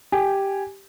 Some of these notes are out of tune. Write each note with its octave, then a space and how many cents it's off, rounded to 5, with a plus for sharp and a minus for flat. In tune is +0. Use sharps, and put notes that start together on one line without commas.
G4 +0 G#5 -5